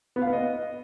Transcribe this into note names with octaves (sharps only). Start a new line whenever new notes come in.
B3
F5
B3
D#5